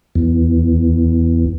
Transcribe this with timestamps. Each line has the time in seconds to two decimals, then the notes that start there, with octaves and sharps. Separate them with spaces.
0.15 E2